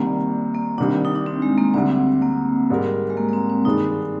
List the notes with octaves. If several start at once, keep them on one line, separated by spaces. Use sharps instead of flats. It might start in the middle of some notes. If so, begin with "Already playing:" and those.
Already playing: C2 C3 D#3 G3 A#3
A#3
C2 C3 D#3 G3 D4
D#4
D4
C4
G#3
A#3
D2 D3 G3 C4
A#3
G#2 G3 D4 G4 A#4
G#3
A#3
A#3
C4
C4
G2 D#3 G#3 D4 D#4